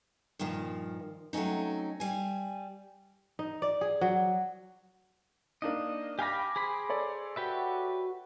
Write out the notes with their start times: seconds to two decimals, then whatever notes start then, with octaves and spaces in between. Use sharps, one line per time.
0.39 G2 A#2 D#3 F3
1.33 F#3 A3 C4 C#4 D#4
2.00 G3 G#5
3.39 D#4
3.62 D5
3.81 G#4
4.01 F#3
5.62 A#3 D4 D#4 D#5
6.19 G4 F5 G#5 B5 D6 A#6
6.56 G#4 C5 B5
6.89 A4 C#5 D5
7.36 F#4 G4 B4 E5